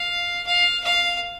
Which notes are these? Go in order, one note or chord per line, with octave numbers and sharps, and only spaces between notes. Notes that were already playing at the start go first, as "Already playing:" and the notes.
Already playing: F5
F5
F5